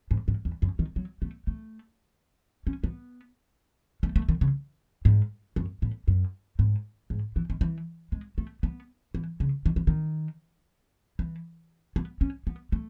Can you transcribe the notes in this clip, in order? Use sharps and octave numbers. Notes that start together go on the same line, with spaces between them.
G#2
G#2
E2
F#2
D#3
F#3
A3
A3
C#4
B3
A3
A3
D#3
C#3
G#2
F#2
A2
F#2
G#2
G#2
E3
D#3
E3
G#3
A3
B3
E3
C#3
D#3
E3
D#3
E3
B3
C#4
B3
A3